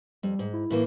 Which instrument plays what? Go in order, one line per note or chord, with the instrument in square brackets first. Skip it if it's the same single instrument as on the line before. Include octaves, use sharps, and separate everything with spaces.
[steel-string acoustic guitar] F2 [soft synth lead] G3
[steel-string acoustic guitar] G#2
[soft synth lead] E4
[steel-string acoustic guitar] A2 E3 A#3